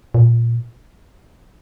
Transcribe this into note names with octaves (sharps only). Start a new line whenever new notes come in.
A#2